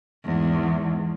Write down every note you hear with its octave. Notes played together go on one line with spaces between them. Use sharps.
E2 G#2